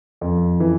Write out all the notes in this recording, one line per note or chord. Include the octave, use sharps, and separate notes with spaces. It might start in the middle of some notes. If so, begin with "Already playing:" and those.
F2
E3